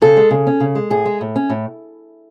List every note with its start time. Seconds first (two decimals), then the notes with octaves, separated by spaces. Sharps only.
0.02 C#3 A4
0.17 G#3
0.31 C#3
0.47 C#4
0.60 C#3
0.75 G#3
0.90 A2 G#4
1.06 G#3
1.21 A2
1.36 C#4
1.50 A2